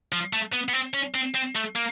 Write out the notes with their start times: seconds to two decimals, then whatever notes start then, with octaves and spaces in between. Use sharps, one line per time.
0.12 F3
0.33 A3
0.53 B3
0.69 B3
0.73 C4
0.94 C#4
1.14 C4
1.34 C4
1.55 A3
1.75 A#3